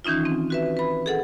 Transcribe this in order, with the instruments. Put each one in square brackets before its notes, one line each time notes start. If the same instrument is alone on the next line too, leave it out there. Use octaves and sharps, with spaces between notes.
[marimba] D#3 E3 C#4 D#4 F4
C4
F#4 B4 E5
B4 B5
G#4 A4 F#5